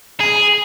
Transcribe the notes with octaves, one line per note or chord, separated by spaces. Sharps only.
G#4